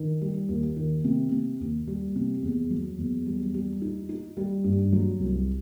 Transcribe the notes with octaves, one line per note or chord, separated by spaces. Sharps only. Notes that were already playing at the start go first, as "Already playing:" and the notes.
Already playing: D#3
G3
D#2
D#3
C3
C3
D#2
G3
C3
E2
F#3
E2
G3
G3
D#4
D#4
G3
G2
F#3
C2